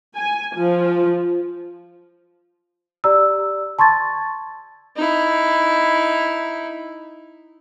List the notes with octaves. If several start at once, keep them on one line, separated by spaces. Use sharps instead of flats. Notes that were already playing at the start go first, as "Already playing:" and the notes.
G#5
F3
G4 D5 A#5 E6
A5 C6 C#6 G#6 A6
D#4 E4